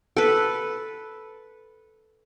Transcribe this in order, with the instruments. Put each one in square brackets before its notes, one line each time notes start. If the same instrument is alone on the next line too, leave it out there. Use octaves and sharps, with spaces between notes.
[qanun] A4 B4